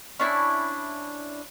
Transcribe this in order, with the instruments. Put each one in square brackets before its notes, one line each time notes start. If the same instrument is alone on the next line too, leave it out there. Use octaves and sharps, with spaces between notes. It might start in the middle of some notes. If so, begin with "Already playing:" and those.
[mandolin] C#4 D4 E4